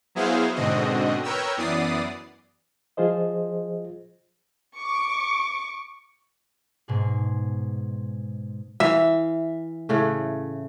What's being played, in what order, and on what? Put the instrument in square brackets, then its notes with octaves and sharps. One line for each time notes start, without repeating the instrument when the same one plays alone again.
[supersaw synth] F#3 B3 E4 G#4 C5 F5
G#2 B2 D3 C4 F#4 D#5
A#4 B4 C#5 G5 E6
F#2 E3 B3 D5 D#6 C7
[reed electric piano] F3 F4 G#4 C5 D#5
[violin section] C#6 D6
[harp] G#2 B2 G#4
[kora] E3 F5 [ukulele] E5
[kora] A2 C#3 A3